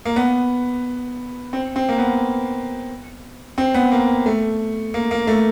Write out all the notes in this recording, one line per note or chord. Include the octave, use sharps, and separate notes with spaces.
A#3
B3
C4
C4
A#3
B3
C4
B3
A#3
A3
A#3
A#3
A3